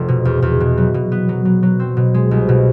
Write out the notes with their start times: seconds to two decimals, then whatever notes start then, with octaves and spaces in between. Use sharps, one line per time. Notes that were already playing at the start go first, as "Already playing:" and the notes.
Already playing: F1
0.08 B2
0.25 E2
0.42 E2
0.60 B2
0.77 F#3
0.94 B2
1.12 B3
1.29 F#3
1.45 F#3
1.63 F#3
1.80 C4
1.97 B2
2.14 G#3
2.31 C2
2.49 B2